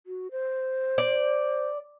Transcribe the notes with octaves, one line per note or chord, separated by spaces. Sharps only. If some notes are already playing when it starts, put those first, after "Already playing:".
F#4
C5
D5